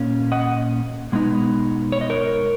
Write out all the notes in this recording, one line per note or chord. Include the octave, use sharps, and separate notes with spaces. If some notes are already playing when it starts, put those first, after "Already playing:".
Already playing: A#2 A#3 C#4
D#5 F#5
B2 G#3 B3 D#4
C#5
D#5
A#4 C#5